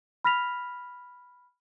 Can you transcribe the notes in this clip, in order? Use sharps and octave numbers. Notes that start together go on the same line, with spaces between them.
B5 F6 A#6 B6 F7